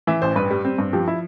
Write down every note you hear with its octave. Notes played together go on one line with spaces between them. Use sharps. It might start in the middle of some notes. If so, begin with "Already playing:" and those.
E3 E5
A1 C5
G2 B4
G3
C4
G2
F3 G4
E4